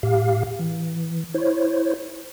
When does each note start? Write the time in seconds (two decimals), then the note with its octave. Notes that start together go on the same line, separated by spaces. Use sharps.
0.03 A2 G4 F5
0.59 E3
1.34 E4 C5 C#5